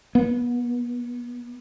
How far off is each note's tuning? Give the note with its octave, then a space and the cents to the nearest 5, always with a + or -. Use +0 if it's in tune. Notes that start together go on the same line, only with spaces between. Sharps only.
B3 -30